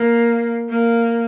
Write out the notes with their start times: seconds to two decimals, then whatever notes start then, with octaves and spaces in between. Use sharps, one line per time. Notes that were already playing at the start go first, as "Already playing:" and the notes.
Already playing: A#3
0.69 A#3